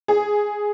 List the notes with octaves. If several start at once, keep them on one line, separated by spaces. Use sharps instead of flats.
G#4